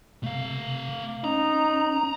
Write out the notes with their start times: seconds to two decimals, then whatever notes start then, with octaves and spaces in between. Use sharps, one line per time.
0.23 C3 A3 F5
1.24 C#4 D#4 A#5